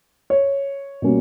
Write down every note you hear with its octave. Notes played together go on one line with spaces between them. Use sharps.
C#5
B2 G3 A#3 C#4